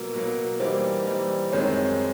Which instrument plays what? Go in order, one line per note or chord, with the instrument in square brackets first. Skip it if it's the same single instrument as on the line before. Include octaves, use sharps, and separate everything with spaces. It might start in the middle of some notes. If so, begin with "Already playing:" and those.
Already playing: [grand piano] B2 F#3 A#3 [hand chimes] A#4
[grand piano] B2 F#3 A#3
[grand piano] E3 G3 A#3 D#4 [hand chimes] C5
[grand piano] E3 G3 A#3 D#4
[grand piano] F#2 D#3 G#3 C4 [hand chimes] C#5